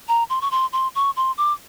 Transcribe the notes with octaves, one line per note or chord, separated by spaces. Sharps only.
A#5
C6
C#6
C6
C6
C#6
C6
D6